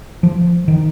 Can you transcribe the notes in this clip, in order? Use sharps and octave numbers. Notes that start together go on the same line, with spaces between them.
F3
D#3